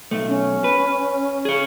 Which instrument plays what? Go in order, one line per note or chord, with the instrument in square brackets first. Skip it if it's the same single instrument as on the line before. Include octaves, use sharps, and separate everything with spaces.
[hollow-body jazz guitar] B1 A3
[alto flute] C#4
[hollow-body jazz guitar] B4
G#4 C#5